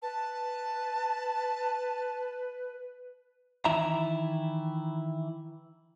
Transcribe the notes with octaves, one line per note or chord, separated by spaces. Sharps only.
B4 A5
D#3 E3 E4 E5 A#5